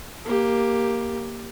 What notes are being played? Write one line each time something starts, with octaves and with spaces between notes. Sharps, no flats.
A#3 G4